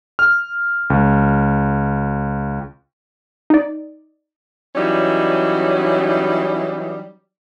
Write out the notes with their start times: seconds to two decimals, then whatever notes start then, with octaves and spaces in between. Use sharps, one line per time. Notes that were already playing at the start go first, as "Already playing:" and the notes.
0.19 F6
0.90 C#2
3.50 D#4 D5
4.75 E3 F#3 G3 C#4 D#4